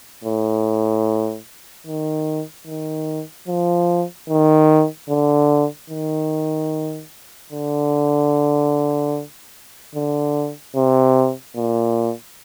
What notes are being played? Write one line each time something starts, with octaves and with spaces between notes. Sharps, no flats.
A2
D#3
D#3
F3
D#3
D3
D#3
D3
D3
C3
A#2